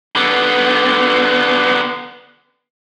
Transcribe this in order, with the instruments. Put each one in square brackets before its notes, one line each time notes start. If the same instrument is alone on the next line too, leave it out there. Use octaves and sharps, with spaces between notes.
[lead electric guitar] D3 B3